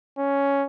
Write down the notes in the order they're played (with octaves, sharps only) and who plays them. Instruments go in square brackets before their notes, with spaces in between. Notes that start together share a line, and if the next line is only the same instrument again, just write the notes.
[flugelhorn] C#4